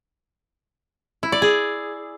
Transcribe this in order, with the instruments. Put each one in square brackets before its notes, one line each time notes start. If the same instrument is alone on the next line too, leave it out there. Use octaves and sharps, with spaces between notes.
[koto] E4
D5
G#4